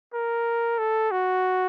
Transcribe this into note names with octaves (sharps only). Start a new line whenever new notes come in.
A#4
A4
F#4